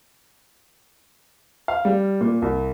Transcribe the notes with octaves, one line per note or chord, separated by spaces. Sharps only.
F5
G3
A#2
C2